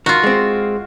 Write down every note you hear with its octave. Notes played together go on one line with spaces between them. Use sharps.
D#3 F4 F#4
G#3 C4